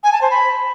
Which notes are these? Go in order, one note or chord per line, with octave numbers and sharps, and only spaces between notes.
G#5
A5
C5
B5